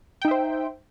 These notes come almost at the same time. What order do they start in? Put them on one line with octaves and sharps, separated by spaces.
G5 D#4 E5 C5